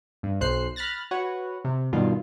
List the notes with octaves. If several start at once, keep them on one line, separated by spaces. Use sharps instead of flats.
G2
B1 C5 F#6 C7
B5 F6 F#6 A6 A#6
F#4 B4 C#5 F#5
C3
G2 B2 D#3 F4